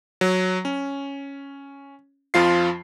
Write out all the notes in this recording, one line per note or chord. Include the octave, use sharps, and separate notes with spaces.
F#3
C#4
F2 F3 F4 C7